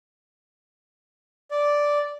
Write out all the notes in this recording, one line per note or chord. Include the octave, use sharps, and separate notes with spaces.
D5